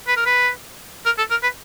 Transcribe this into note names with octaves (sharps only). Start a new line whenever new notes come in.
B4
A#4
B4
A#4
A4
A#4
B4